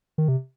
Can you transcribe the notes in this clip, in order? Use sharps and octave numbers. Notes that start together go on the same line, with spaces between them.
D#3
C3